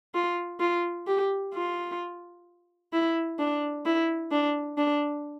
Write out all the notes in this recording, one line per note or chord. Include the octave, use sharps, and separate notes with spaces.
F4
F4
G4
F4
E4
D4
E4
D4
D4